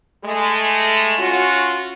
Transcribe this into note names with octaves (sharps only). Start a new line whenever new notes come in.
G#3 A3
C#4 F4 F#4